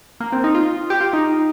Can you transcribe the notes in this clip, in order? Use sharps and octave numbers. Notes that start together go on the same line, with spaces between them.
A#3
C4
D#4
F4
G4
F4
D#4